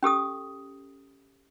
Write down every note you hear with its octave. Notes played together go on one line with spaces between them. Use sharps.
C#4 G4 A4 D#6